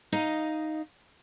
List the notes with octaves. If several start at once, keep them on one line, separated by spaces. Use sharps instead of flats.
D#4 D#5 F5